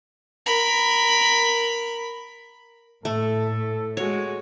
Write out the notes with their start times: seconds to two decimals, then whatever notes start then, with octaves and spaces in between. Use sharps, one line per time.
0.46 A#4 B5
3.05 A2 A3 A4
3.97 G#3 F#4 C#5